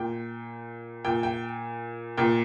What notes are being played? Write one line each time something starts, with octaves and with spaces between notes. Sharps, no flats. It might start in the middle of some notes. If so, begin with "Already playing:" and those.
Already playing: A#2 G5
A#2 G5
G5
A#2 G5